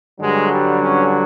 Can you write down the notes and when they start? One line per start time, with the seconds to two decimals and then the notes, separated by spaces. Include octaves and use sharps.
0.19 G2 D3 F#3 G#3
0.49 G3
0.79 C#4